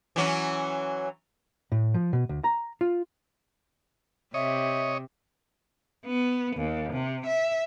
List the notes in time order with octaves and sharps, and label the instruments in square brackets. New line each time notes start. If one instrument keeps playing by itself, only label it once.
[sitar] E3 F#3 C#4
[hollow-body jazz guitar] A2
F3
B2
D2
A#5
F4
[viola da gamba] C3 [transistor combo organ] C#5 D#5 [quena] E5
[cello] B3
D#2
C3
E5